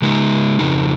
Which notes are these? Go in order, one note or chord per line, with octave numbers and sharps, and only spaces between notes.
C#3 G#3 D#4
F2 C#3 D#4